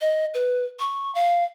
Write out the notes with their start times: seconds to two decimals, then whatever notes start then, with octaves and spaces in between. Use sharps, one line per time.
0.01 D#5
0.34 B4
0.79 C#6
1.15 F5